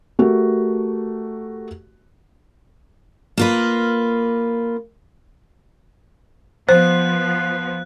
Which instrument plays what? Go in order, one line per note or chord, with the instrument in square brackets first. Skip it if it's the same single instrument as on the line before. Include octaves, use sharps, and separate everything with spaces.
[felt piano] A3 F#4 G4 A#4
[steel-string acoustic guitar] A#3 F4 B4
[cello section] F3 B3 [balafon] C5 [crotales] F#6